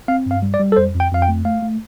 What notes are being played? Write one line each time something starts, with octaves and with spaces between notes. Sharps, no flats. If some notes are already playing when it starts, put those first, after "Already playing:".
C4 F5
G2 F5
G3
D5
G3
A4
F2 C5
F2
G5
F2 F5
G5
A3
A3 F5
A3